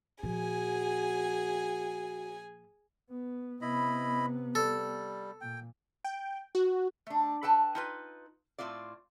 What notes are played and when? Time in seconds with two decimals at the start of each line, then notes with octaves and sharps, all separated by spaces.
0.23 A#2 F3 F#4 G#4 G#5
3.10 B3
3.61 C3 B3 E4 D#5 B5
4.55 G3 A4
5.41 A#2 G5
6.04 G5
6.55 F#4
7.07 A3 D4
7.43 A4 B4 G5 A5
7.75 D#4 F4 B4
8.58 A2 C4 F4 D5